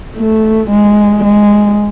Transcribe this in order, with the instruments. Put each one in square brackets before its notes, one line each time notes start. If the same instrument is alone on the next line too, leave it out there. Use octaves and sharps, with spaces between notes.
[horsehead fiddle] A3
G#3
G#3